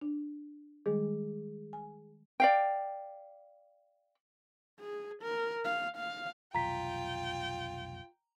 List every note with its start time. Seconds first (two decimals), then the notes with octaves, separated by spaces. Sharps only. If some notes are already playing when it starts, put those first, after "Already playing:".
0.01 D4
0.86 D#3 G3 G#3 G#4
1.73 G#5
2.40 D5 F5 G5
4.80 G#4
5.23 A#4
5.64 F5
5.97 F5
6.55 F1 B1 F4 G5 A#5 B6